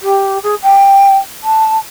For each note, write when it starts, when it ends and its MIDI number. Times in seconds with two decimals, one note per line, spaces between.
0.01 0.38 67
0.43 0.55 68
0.63 1.17 79
1.43 1.78 81